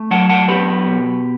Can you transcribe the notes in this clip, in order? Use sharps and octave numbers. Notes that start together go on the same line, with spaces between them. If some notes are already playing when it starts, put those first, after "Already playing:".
Already playing: A3
F#3 F#5 A5
F#5 A5
B3 G4 B4
B2